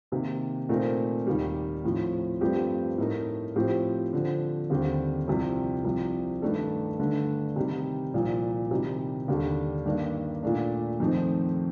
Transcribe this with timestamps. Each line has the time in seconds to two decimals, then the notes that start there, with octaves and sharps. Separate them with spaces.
0.12 C3 D#3 A#3
0.69 A#2 A3 C4 D#4 A#4
1.27 D#2 D#3 G3
1.84 A2 F3 C4
2.41 G2 F3 A3 C4 G4
2.98 A2 A3 D#4 A#4
3.56 A2 F3 C4 G4
4.13 D3 F3 C4
4.70 D#2 D3 G3 C4 G4
5.28 C2 C3 F3
5.85 C2 C3 F3
6.42 G2 D#3 A3 D4 A4
6.99 G2 D3 A3 D4
7.56 C3 D#3 G3
8.14 C2 A#2 F3
8.71 C3 D#3 G3
9.28 D#2 D3 G3 D4 A4
9.85 G2 D#3 A#3 D4
10.43 A#2 A3 D4
11.00 F2 D#3 A3 C4 D#4